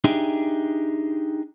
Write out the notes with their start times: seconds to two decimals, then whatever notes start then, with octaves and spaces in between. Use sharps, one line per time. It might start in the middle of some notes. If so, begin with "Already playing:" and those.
0.04 D4 D#4 G4 G#4 E5